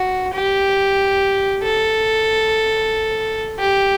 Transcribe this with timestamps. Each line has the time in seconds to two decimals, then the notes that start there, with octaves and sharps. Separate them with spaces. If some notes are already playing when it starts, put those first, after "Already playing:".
Already playing: F#4
0.33 G4
1.63 A4
3.60 G4